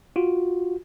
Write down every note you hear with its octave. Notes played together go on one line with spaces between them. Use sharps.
F4 F#4